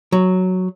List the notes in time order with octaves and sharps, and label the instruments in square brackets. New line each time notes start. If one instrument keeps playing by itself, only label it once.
[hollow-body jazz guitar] F#3